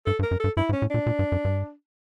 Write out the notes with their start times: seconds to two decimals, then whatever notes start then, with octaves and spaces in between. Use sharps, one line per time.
0.06 G2 A4
0.19 G2
0.23 A#4
0.31 F#2
0.40 G2 A4
0.57 G2 E4
0.69 G#2
0.73 C#4
0.82 A2
0.91 A#2 D4
1.06 A#2
1.19 G2
1.32 F#2
1.45 G2